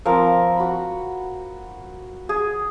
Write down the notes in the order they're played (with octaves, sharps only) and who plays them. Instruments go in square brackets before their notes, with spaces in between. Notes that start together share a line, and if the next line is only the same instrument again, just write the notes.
[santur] F3 C4 A#4
F#4 B5
G#4